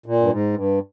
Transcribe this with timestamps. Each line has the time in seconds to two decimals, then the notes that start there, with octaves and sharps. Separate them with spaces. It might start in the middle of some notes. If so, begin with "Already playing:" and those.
0.06 A#2
0.20 G2
0.30 G#2
0.54 G2